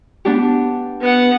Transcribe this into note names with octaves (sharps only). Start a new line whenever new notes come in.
B3 D4 G4
B3 F#5